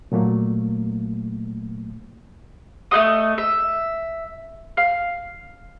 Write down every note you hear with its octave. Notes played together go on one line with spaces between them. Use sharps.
A#2 F#3 A3 A#3
A3 F#4 D#5 D#6
E5
F5